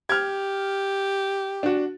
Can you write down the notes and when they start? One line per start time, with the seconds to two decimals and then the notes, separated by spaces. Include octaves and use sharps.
0.09 G4 F6 G#6
1.63 D4 F#4